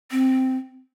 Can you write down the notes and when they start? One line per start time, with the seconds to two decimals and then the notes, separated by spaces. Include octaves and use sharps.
0.11 C4